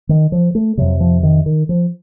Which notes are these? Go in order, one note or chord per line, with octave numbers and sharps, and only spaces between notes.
D#3
F3
A3
F2 C3 F#3
F3
D#3
D#3
F3